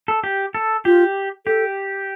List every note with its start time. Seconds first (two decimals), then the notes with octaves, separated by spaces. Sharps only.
0.08 A4
0.24 G4
0.55 A4
0.85 F4 G4
1.46 G4 A4